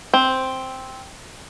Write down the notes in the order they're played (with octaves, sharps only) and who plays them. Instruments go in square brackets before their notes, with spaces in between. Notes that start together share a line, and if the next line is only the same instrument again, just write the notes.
[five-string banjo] C4